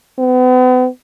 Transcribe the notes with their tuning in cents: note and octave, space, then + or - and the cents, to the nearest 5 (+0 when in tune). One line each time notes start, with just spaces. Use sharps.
B3 +40